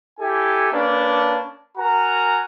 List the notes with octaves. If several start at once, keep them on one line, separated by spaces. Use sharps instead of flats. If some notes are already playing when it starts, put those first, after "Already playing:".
E4 G4 A4 G#5
A#3 C#4 D4 B4 A5
F#4 A#4 G#5 A#5